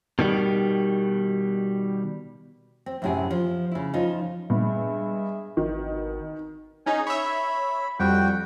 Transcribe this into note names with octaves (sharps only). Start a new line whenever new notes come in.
B2 D#3 G3
C4
F#2 A2 C3 E4 G#4
F3
C#3 E4
F3 C#4 D#4 F4
G2 A#2 G#3 B3 G#4 E5
G#1 B2 D#3
C#4 D#4 G#4 G#5
C#5 E5 B5
F2 G3 F#4 G5